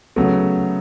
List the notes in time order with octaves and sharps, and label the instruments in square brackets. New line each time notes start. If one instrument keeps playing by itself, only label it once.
[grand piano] C#3 F#3 A3 B3